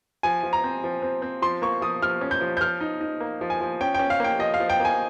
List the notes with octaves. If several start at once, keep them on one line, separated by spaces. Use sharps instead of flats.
F3 G#5
F3
A#5
C4
F3
C4
C4
F3 C6
A#3 C#6
F3 D#6
F3 F6
C#4
G6
F3
G6
F3 F6
D#4
D#4
A#3
F3
G#5
F3
C#4 G5
C#4 G5
F5
A#3 G5
F3 D#5
F5
F3
G5
A#3
G#5